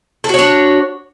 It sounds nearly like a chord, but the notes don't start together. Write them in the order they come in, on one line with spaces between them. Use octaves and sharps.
A4 F#4 C#5 D4